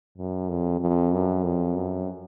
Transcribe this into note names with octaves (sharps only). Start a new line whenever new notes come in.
F#2
F2
F2
F#2
F2
F#2